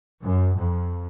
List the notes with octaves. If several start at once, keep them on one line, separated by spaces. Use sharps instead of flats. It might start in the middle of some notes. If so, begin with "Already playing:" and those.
F#2
F2